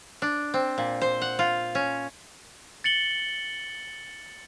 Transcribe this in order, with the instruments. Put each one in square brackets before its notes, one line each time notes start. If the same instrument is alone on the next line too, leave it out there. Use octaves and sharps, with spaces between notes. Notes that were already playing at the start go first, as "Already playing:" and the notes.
[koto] D4
C4
A#2
C5
F#5
F4
C#4
[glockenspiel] A6 C#7 F#7 G7